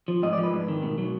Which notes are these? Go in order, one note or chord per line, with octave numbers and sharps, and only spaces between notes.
F3
G#2 D#5
D5
F3
B4
G#2
D#3
B2
F#3